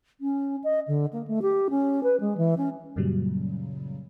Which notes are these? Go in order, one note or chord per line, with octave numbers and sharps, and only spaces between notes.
C#4
D#5
D3
A#3
A3
G4
C#4
B4
G#3
E3
C#4
F#2 A#2 C#3 F#3 G3